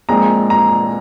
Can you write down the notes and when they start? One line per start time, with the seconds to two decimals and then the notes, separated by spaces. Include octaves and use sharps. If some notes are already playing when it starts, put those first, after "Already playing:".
0.09 A#1 A#2 G#3 C4 A#5
0.50 A#5